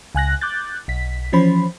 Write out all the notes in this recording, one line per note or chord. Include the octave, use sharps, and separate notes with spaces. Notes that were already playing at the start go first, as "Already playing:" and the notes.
C#2 G#5 F#6 A#6
D6 F#6 G6 A6
B1 B6
E3 F3 C#4 C5 B5